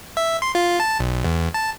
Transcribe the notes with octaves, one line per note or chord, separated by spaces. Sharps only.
E5
C6
F4
A5
B1
E2
A5